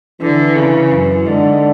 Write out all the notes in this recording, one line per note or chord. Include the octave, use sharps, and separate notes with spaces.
D3 E3
C#3
F#2
G#2 D3